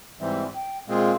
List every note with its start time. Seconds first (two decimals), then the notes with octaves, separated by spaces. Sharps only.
0.20 G#2 E3 G3 C4 E5
0.54 G5
0.88 A#2 G#3 C4 F4 G#4 F5